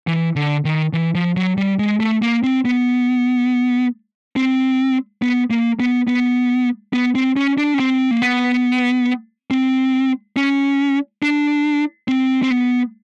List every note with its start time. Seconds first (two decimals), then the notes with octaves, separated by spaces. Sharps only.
0.07 E3
0.36 D3
0.65 D#3
0.93 E3
1.15 F3
1.36 F#3
1.57 G3
1.79 G#3
2.00 A3
2.22 A#3
2.43 C4
2.65 B3
4.36 C4
5.22 B3
5.50 A#3
5.80 B3
6.07 B3
6.93 B3
7.15 C4
7.36 C#4
7.58 D4
7.74 C#4
7.80 C4
8.11 A#3
8.22 B3
9.51 C4
10.36 C#4
11.23 D4
12.08 C4
12.43 C4
12.51 B3